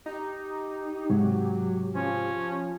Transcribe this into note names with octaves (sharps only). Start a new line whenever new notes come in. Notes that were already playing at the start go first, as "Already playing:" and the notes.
D#4 G4
G#2 C3 F#3
F3 C#4